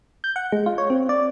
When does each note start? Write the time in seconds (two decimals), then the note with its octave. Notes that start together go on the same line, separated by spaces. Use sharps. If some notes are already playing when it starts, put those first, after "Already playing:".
0.24 G6
0.36 F#5
0.52 G#3
0.66 F4
0.78 C#5
0.90 C4
1.09 D5